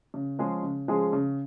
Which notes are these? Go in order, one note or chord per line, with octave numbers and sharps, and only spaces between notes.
C#3
F3 G#3 C#4 G#4
C#3
F3 G#3 C#4 G#4
C#3